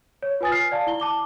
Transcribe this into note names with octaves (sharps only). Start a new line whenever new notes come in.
C#5
F4 B4 G#5 D#6 A6
F6 C7
D5 F5 A5
E4 G7
A5 D6 G7